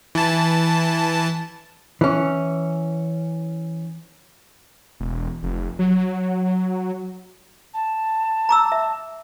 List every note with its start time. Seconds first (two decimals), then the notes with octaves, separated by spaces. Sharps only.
0.15 E3 A5
2.01 E3 C#4
5.00 E1
5.43 F1
5.79 F#3
7.74 A5
8.49 A#5 D6 E6
8.72 E5